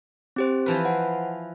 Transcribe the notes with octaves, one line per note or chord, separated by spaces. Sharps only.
C4 G4 C5
E3 F3 B4
C5 F#5